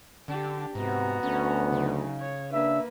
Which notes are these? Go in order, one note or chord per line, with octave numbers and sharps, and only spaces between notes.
D3 D4 G4
G#2 C3 B3 F#4 A#5
D2 C#4
C#3 F#3 D#4
C#5
A#3 D4 B4 E5